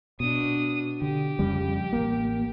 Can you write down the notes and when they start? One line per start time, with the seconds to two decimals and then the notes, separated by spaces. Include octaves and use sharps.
0.20 B2 D4 D#6
1.02 D3 G4
1.39 F2 C#3 G3
1.93 A1 A#3